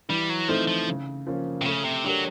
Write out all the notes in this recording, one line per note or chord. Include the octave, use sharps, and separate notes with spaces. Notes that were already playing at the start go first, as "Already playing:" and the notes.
E3 G3
F#3
F3 A3 C4 D#4
F3
C#3
F3 A#3 C#4
C3
C#3 A3
C3
F#3 D4 G4 A#4